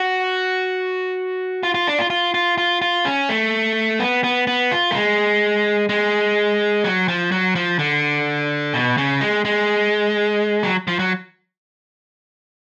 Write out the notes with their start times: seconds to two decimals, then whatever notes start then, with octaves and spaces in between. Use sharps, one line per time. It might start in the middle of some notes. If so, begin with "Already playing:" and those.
Already playing: F#4
1.63 F4
1.75 F4
1.87 D4
1.99 F4
2.10 F4
2.34 F4
2.58 F4
2.82 F4
3.05 C#4
3.29 A3
3.99 B3
4.24 B3
4.47 B3
4.72 F4
4.91 A3
4.95 G#3
5.89 G#3
6.84 F#3
7.08 F3
7.32 F#3
7.55 F3
7.79 D3
8.74 B2
8.98 C#3
9.21 G#3
9.45 G#3
10.63 F#3
10.87 F3
10.99 F#3